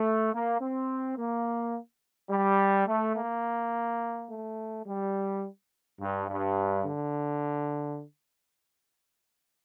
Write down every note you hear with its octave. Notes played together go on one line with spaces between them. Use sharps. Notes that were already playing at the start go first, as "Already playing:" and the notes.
Already playing: A3
A#3
C4
A#3
G3
A3
A#3
A3
G3
G2
G2
D3